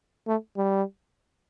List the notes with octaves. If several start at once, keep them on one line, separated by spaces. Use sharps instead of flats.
A3
G3